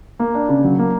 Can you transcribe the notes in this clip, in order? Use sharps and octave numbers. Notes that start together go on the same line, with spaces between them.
A#3
D4
C#3
F#3
A#3